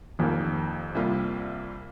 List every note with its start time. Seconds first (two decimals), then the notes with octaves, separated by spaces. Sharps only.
0.19 F1 F2 D#3 A#3
0.95 C2 C3 G3 A#3 F4